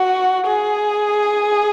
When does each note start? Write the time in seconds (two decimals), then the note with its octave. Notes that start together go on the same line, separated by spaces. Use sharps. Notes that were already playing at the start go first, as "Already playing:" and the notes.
Already playing: F#4
0.47 G#4